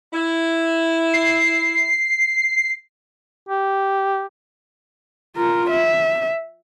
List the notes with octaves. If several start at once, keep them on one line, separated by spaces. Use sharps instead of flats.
E4
C7
G4
F4 A#4
E5